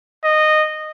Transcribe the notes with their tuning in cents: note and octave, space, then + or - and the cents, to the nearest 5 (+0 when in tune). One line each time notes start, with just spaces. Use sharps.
D#5 -15